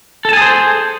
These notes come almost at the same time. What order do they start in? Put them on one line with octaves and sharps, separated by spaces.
A4 A5 G#5 G#4 C5